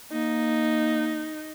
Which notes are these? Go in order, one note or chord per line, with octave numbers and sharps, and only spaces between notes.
A#3 D#4